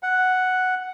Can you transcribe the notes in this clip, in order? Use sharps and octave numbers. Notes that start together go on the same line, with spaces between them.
F#5